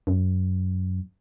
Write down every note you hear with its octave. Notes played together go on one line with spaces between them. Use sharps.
F#2